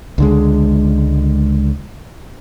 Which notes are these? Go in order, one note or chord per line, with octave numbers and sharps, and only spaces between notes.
C#2 D3 G#3